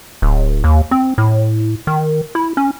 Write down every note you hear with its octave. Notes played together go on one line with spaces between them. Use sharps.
D1
D#2
C4
A2
D#3
E4
C#4